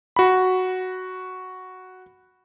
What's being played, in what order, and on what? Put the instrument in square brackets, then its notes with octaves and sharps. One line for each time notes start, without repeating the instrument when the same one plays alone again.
[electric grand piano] F#4 B5